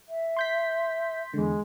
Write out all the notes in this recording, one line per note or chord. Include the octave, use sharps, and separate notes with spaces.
E5
C6 G6 B6
E2 D3 G#3